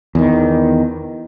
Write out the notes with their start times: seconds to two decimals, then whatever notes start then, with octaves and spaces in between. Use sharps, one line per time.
0.15 E2 D#3